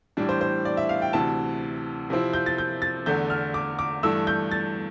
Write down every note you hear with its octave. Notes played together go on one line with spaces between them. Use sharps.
A2 E3 G3 D4
C5
C5
D5
E5
F5
G5
D2 C3 E3 A5
C3 F3 C4 E4
G6
A6
G6
A6
E2 D3 A3 G6
F6
D6
D6
G2 E3 A3 E6
G6
A6